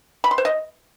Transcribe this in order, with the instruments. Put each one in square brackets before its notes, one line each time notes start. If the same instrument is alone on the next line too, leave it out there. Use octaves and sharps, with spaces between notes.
[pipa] B5
C6
C5
D#5